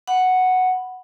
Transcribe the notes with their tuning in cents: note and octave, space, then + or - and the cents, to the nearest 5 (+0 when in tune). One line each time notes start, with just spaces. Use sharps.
F#5 +0 B5 +0